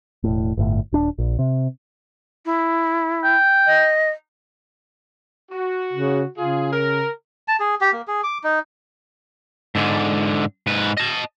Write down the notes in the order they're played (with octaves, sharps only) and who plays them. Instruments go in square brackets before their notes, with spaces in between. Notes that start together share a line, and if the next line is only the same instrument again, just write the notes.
[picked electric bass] E1 A2
G1 A2
D#1 D4
A#1
C3
[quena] E4
[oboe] G5
[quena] D#5
[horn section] F#4
[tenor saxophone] C#3
[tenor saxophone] C#3 [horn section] F4 G#4
[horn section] A#4
[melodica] A5
G#4
G4
A#3
G#4
D6
D#4
[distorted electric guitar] G#2 D3
G#2 B4
D#5 A5